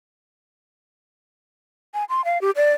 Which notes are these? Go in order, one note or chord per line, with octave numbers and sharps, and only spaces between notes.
G#5
C6
F5
G4
D5